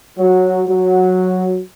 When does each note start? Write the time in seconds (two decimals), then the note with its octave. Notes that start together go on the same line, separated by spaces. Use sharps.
0.18 F#3
0.68 F#3